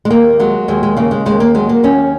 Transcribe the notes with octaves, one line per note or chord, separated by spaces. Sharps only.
G#3
D#2 A#3
F#3 G#3
D#2 G#3
G#3
C#3 A#3
G#3
D#2 G#3
A#3
F#3 G#3
A#3
D#2 C#4